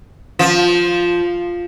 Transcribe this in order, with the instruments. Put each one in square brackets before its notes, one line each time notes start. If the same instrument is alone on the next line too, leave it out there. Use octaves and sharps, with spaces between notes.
[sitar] F3